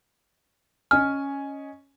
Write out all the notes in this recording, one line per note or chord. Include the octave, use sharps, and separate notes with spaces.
C#4 D#5 G#5 F6